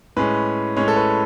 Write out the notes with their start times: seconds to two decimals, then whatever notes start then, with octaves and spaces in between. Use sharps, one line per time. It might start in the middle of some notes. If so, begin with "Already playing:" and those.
0.17 A2 G#3 C#4 B4
0.76 A2 G#3 C#4 C#5
0.88 A4
0.96 B4